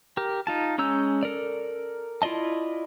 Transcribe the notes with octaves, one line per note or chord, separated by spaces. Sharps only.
G4 A#4
D#4 F4 A5
G#3 C#4 A#5 E6 G6
A4 A#4 D5
E4 F4 D5 D#5 A5